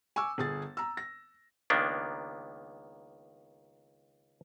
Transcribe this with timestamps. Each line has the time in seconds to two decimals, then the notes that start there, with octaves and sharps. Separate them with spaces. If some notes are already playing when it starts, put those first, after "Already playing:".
0.16 G#5 C#6 D6 E6
0.38 G1 G#4 A6
0.77 A#5 E6
0.97 A#6
1.70 C#2 D#3 A#3 B3 D4